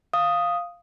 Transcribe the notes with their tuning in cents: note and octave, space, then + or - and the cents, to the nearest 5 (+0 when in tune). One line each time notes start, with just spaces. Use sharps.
F5 +0 D#6 +0